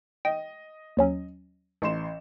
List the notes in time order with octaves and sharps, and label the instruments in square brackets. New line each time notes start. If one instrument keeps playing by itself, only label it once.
[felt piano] D#5 [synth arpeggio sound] G5
[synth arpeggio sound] D#2 F#3 C#4
[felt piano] A1 C6 E7